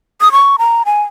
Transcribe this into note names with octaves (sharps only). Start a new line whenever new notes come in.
D#6
C#6
A#5
G#5